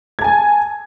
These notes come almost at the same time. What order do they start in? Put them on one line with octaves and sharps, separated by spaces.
G#6 A5 G#5